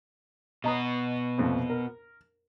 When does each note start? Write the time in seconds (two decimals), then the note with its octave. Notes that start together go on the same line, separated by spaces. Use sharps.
0.64 B2 B3 D#5 A#5 D#6
1.38 C2 F2 A#2
1.70 A#4